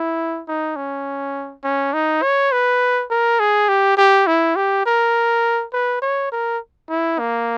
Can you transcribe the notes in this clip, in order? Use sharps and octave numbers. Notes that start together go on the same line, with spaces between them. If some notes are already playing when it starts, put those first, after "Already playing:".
Already playing: E4
D#4
C#4
C#4
D#4
C#5
B4
A#4
G#4
G4
G4
E4
G4
A#4
B4
C#5
A#4
E4
A#3